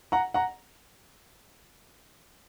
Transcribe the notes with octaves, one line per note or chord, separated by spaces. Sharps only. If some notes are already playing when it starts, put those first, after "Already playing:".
F#5 A#5
F#5 A#5